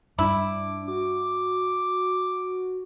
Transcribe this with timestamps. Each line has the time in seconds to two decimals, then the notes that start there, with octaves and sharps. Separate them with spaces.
0.19 G2 D4 E4 D6
0.88 F#4 D6